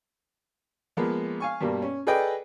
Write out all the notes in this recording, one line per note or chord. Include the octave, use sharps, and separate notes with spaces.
F3 G#3 A#3 B3
F5 G#5 C#6
G2 B2 G3 A#3
C#4
G#4 A4 B4 D5 D#5 G5